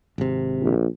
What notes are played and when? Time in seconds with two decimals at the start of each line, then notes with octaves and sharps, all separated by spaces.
0.18 G#1 C3
0.61 A#1